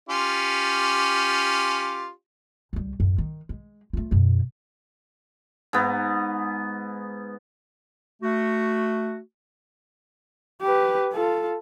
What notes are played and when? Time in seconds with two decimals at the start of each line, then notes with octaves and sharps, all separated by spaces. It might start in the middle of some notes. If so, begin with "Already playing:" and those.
0.09 C#4 F4 G4
2.73 C#2 G3
3.00 F#2 A2
3.18 D#3
3.49 G#3
3.93 A3 F4
4.11 F#2 B2
5.73 G#2 B3
8.22 A3 F#4
10.62 G4 B4
11.13 F4 A4